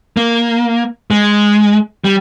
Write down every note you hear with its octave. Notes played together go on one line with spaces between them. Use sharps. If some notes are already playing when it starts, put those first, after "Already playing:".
A#3
G#3
G3